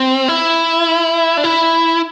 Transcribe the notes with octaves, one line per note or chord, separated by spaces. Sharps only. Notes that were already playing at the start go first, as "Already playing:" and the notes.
Already playing: C4
E4
D4
E4